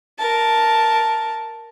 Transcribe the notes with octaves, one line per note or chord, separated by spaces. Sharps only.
A#4 A5